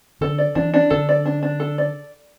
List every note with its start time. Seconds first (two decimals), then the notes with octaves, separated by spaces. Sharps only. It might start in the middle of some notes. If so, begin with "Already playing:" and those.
0.21 D3 A4
0.38 D5
0.55 E3 D4
0.74 D4
0.90 D3 A4
1.09 D5
1.25 D4
1.43 D4
1.60 A4
1.78 D5